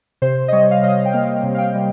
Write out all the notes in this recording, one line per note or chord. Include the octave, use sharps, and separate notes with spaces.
C3 C5
D#5
G3 C#5
F5
C3 D#5
G5
A#3 F5
C3
F5
G5
G3